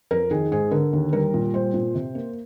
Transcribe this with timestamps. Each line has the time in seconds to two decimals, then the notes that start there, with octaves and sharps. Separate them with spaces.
0.11 F2 A#4
0.31 D#3 G#4
0.52 G#2 G#4
0.71 D3 A#4
0.93 D#2
1.13 G3 A#4
1.34 A#2
1.54 G3 C5
1.74 A#2
1.95 C3
2.15 A#3